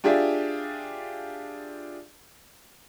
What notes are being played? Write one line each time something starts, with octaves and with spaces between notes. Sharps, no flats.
D4 F4 G4 G#4 D5 E5